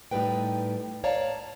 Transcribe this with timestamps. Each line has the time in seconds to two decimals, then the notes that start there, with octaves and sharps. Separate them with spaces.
0.11 A2 G3 D#4 B4 G5
1.04 C#5 D5 F5 A5 A#5